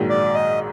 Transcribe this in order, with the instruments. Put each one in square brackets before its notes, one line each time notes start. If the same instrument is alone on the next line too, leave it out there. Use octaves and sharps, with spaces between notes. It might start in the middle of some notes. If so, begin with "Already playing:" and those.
Already playing: [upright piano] A#1 G#2 D#3 F#3
[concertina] D5
D#5